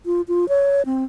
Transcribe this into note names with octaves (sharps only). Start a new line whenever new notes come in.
F4
F4
C#5
C4